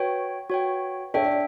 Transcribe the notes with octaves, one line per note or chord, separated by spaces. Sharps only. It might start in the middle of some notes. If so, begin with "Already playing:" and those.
Already playing: F#4 B4 C#5 G5
F#4 C#5 G5
D4 A4 C#5 E5 G5
D5